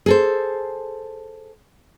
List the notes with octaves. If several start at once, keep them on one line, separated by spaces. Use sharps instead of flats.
G#4 A4 C5